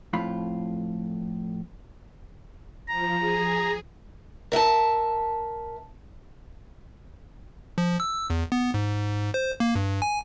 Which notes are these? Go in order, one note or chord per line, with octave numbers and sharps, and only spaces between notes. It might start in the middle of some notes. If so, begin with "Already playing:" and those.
F2 A2 F4 B5
F3 A#5
G#4
A#4 E5 F5 A5
F3
E6
E2
B3
G#2
C5
A#3
G2
G#5